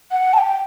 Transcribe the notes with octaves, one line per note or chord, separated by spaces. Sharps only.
F#5
A5
G5